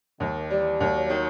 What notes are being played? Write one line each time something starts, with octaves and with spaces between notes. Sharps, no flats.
D#2 D#3
E3 G3
D#2 F#3
D#3